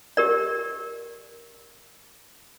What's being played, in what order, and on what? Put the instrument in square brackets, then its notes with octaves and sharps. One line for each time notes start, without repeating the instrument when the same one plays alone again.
[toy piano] G4 A#4 D5